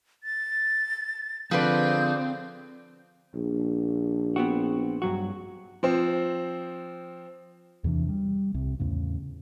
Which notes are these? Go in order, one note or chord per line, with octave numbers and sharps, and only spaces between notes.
A6
D3 F3 C4 G#4 B4 D5 G6
A#1
B3 C4 F#4
G2 F#3 F#4
F3 C4
E2 C3 E3 D4
G3
C2 C3
E2 A2 C#3